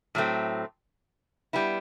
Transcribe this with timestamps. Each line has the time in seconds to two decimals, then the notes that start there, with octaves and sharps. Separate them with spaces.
0.15 A2 F#3 A3 C4
1.53 G3 B3 E4